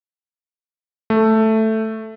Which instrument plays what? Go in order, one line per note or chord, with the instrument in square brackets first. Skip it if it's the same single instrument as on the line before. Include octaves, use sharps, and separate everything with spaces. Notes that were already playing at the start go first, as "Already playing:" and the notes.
[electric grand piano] A3